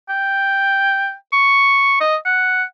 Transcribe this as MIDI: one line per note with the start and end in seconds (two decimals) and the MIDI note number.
0.10 1.13 79
1.33 1.98 85
2.01 2.16 75
2.26 2.63 78